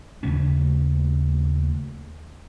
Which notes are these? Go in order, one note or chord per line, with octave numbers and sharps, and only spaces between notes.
D#2 C#3 A3 C#4